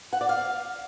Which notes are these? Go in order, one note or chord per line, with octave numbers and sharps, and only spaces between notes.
F#5
D5
F5